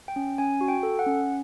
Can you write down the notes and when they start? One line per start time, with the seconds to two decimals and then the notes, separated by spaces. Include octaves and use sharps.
0.08 G5
0.16 C#4
0.38 C#4 G#5
0.61 F#4
0.68 G5
0.83 A4
0.99 F#5
1.06 C#4